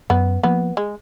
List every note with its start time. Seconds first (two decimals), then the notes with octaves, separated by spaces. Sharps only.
0.10 F#2 B3
0.43 F3 A#3 B3
0.77 G#3